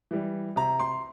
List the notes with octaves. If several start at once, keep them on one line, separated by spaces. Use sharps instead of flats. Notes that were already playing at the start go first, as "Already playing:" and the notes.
E3 G3
C3 A#5
C6